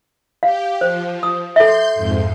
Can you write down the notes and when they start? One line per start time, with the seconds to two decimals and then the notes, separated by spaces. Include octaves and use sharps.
0.43 G4 F5
0.81 F3 C5
1.23 D#6
1.56 A4 E5 C6 G6
1.95 F2 G#2